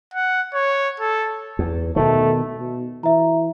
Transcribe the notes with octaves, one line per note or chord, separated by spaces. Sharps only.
F#5
C#5
A4
E2
B2 D#3 A3
B2
E3 E5 A#5